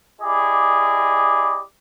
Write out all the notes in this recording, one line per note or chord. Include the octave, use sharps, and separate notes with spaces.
E4 G4 G#4 D5 D#5 D6